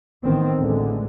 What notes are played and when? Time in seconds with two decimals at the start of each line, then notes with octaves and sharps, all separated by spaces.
0.24 A1 D#3 B3 C4
0.57 A1 D2 D3 G#3